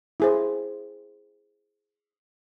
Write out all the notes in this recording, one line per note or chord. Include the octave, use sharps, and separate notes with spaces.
E4 G#4 C5